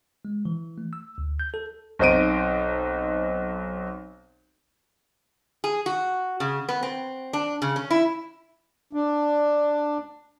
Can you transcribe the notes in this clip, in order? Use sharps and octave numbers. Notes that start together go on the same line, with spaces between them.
G#3
E3
A3
E6
D2
G6
A4
B1 C4 D#4 C5 D7 D#7
G#4
F#4
C#3
B3
C4
D4
C#3
C#4
E4
D4